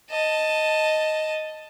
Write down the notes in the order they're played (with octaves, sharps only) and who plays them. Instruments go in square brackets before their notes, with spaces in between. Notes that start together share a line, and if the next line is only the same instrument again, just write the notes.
[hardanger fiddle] D#5 A5